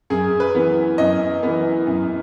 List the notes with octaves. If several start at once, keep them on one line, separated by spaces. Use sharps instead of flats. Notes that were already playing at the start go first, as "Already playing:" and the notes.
F#2 G#4
B4
E3 B3
F#2 D#5
E3 B3
F#2